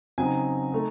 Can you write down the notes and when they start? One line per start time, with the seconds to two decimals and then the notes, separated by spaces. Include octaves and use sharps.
0.18 C#3 F#3 C4 D#4 G#5
0.72 A3 D#4